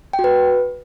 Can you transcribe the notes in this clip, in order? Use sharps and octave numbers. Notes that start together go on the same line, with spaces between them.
G5
F#4
B4